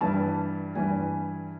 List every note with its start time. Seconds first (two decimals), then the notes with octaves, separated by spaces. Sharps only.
0.01 G2 E3 G3 A5
0.75 G2 E3 G3 G#5